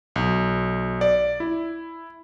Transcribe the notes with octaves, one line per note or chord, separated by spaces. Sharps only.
B1
D5
E4